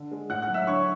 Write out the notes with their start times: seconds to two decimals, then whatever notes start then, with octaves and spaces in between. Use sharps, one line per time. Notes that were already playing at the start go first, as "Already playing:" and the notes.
Already playing: D3
0.11 G#3
0.29 A2 F#5 F#6
0.42 F#5 F#6
0.49 F#3
0.54 E5 E6
0.67 D3 C#5 C#6